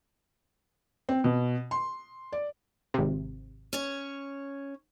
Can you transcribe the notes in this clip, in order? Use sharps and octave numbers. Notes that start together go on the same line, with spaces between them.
C4
B2
C6
D5
G#1 C3
C#4 C#5